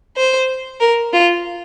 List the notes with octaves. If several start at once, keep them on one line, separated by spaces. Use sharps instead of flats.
C5
A#4
F4